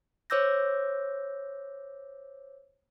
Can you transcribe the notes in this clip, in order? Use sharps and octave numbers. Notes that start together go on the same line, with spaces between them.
C5 C#5 D6 E6 G6 A#6